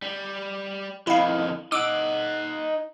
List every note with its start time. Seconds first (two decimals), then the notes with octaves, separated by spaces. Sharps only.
0.02 G3
1.07 F2 D#3 E4 F5
1.72 D#4 F#5 D6 E6 D7